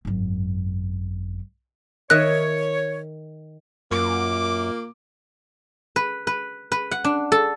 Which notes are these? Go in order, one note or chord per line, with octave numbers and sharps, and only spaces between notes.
G#1 F#2
D#3 C#5 D#5 E5 F#6
F#2 A#2 A#3 D6
B4
B4
B4
F#5
D4
A4